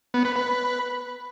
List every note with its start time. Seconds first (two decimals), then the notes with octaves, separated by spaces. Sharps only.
0.14 B3
0.25 B4
0.36 B4